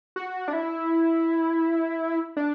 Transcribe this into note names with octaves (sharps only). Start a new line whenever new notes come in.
F#4
D4
E4
D4